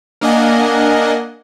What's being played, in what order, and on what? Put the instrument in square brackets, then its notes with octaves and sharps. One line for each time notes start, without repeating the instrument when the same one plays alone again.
[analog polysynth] A#3 D4 D#5 F#5 G#5